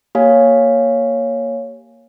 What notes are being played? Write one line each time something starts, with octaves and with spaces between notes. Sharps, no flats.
A#3 G4 C#5 F5 G#5